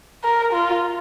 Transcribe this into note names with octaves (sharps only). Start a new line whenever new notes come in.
A#4
F4